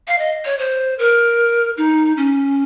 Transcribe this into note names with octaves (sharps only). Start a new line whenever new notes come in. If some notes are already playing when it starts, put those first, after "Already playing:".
F5
D#5
C#5
C5
A#4
D#4
C#4